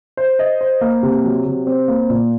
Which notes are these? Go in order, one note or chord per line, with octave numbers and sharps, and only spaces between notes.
C5
D#5
C5
A#3
C3
F#3
C3
C4
A#3
A#2